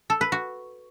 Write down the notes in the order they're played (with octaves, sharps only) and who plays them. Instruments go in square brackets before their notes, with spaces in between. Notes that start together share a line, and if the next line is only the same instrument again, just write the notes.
[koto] A4
B4
F#4